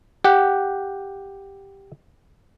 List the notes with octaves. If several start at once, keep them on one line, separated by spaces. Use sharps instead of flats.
G4 F#5